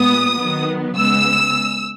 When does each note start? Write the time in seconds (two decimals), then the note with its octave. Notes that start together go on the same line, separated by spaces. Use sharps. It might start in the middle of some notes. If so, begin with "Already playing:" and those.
Already playing: A#2 G#3 B3 D#6
0.37 D#3 F#3 B3
0.96 C#3 G#3 B3 E6